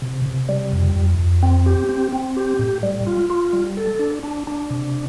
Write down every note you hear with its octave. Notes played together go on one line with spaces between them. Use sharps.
C3
C3
G3
F2
F2
F2
C4
G4
C4
C4
G4
A2
G3
F4
F4
G3
A4
D4
D4
D4
C3